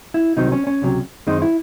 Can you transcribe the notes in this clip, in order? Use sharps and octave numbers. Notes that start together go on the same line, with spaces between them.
E4
C2 C3 D#3 F#3 C4 D#4
C#4
C#4
C#2 C3 F#3 C#4
F#2 D#3 G#3 C4 D#4
E4